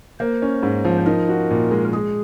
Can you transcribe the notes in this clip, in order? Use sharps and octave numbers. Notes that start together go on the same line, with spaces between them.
A#3 C5
C#4
G#2
F3
D#4 A#4
F#4
A#2
G#3
G#3 G#4